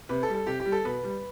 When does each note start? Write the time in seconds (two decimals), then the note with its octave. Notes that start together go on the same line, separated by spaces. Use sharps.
0.09 C3 B4
0.23 A4
0.28 G3
0.34 A4
0.47 C3 G4
0.60 G4
0.65 G3
0.72 A4
0.85 B2 B4
1.03 G3